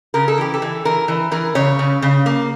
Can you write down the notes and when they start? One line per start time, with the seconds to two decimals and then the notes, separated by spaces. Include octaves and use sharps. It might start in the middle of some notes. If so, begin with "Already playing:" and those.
0.14 C#3 A#4
0.28 A4
0.38 E3 G4
0.54 A4
0.62 E3
0.85 E3 A#4
1.08 E3
1.31 E3 A#4
1.55 C#3 C#5
1.79 C#3
2.02 C#3
2.26 A#3